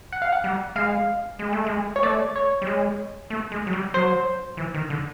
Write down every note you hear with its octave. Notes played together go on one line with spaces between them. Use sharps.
F#5
F5
F#5
G3
G#3 F5
G#3
A3
G#3
C#5
A3 D5
C#5
G3
G#3
A3
G#3
F#3
G3
F#3 C5
E3
D#3
D3